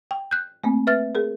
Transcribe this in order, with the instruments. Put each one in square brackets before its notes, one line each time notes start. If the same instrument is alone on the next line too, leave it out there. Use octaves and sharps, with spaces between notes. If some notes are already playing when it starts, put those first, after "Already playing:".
[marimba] G5
F#6 G6
A3 A#3 C4
B4 E5 F6 A6
G#4 A#4